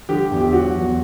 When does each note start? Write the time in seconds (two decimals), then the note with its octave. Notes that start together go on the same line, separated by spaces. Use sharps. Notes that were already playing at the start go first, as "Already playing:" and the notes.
0.09 D3 G4
0.31 E2
0.41 G4
0.53 F#3 F#4
0.76 E2